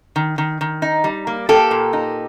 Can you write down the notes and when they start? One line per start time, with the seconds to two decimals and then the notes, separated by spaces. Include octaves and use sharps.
0.16 D#3
0.38 D#3
0.61 D#3
0.82 D#4
1.04 G3
1.27 A#3
1.49 A#3 G4 A4
1.71 A#2
1.93 D#4